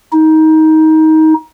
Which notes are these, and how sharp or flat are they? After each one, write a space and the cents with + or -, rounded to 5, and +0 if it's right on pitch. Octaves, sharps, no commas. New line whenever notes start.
D#4 +20